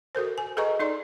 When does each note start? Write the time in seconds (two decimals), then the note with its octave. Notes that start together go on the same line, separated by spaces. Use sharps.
0.15 F#4 A4 A#4 C5
0.38 G#5
0.57 G#4 A4 B4 D#5 A#5 C#6
0.79 D#4 A4 D5 C6